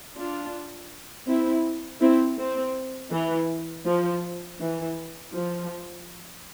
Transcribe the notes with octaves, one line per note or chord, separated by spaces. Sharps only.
D4 F4
C4 E4
C4 E4
C4
E3
F3
E3
F3